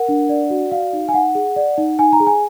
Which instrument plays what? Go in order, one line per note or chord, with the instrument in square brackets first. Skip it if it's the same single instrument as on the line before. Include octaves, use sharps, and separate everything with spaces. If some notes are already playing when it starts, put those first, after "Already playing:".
Already playing: [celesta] A#4 F#5
D4
D5
F#4
D5 F5
D#4
G#5
D#4 F#5
G#4
D5
D#4
D#4 G#5
A#5
G#4
G#5